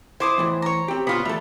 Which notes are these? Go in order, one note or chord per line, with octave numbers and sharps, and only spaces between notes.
E4 C5 D6 D#6
E2 A2 E3
C#5 A#5
C4 G4
A#2 B3 F4 F#4
E2 G3 A3 A4 E5